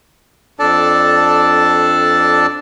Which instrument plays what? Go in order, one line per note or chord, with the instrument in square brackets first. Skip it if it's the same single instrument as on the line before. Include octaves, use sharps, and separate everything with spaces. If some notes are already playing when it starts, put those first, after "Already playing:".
[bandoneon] F2 D4 A4 D5 A5